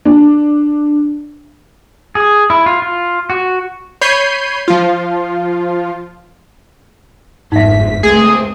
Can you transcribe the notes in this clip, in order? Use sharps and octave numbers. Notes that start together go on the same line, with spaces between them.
D4
G#4
E4
F4
F4
F#4
C#5 B5 G6 C7 D#7
F3 F4
G1 F2 G#2 D#4 E5 B6
C#2 G#3 A3 C4 G#4